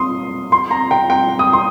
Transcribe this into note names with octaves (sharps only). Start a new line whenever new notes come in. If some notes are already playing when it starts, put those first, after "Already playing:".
Already playing: C6 D#6
C6
A#5
G5
G5
D#6
C6